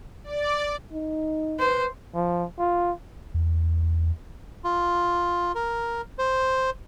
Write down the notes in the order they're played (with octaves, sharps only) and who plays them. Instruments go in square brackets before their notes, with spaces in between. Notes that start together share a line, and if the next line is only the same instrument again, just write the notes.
[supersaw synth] D5
[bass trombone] D#4
[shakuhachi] B4 [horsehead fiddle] C5
[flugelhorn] F3
F4
[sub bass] E2
[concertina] F4
A#4
C5